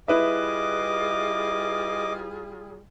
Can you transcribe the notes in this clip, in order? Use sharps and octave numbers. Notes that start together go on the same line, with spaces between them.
G3 E4 F4 G#4 B4 D#5 E5 D6